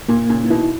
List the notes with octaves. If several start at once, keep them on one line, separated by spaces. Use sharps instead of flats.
A#2 A#3
A#2 C#3
E3
B2 D#3 E4